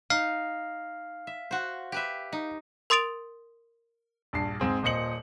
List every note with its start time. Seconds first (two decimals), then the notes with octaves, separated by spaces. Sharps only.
0.10 D#4 F5
1.27 E5
1.51 F#4 C5
1.92 G4 B4 E5
2.33 D#4
2.90 A#4 C6 D#6 A6 D7 F7
4.33 A#1 G2 A5 C7
4.60 G#2 C4 G#4
4.83 D#1 A#2 C5 D#5 C#7 F#7